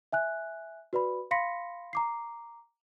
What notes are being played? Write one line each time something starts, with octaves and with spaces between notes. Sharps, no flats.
E5 G#5 F#6
F#4 B4 D5 B5
F5 B5 C6 A#6 B6 C#7
A#5 D6 C7